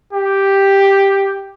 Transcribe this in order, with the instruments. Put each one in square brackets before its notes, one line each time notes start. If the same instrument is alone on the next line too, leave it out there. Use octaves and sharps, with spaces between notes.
[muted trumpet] G4